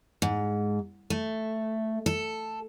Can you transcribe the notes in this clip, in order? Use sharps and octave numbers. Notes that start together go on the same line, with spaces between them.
G#2
A3
A4